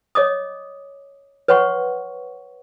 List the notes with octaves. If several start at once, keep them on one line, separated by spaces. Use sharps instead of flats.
C#5 D#5 D6 D#6
B4 C#5 F#5 C6 C#6